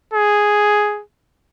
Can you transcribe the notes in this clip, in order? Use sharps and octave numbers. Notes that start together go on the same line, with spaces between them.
G#4